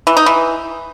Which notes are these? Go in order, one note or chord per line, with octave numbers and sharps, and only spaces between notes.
E3
D#4
E3